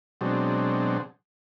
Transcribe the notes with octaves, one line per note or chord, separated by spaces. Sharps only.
B2 F#3 G#3 C4 D4